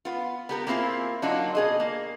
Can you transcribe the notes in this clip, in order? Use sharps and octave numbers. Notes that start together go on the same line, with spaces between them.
B3 F4
B3 G4 A#4
A#3 C4 E4 F4 G#4
F#3 A#3 D4 D#4 F4
B2 G#4 D#5
A#3